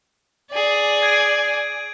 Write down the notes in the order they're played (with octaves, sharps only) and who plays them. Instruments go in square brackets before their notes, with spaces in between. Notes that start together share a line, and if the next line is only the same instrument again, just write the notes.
[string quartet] G#4 D5
[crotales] G#6 D7 D#7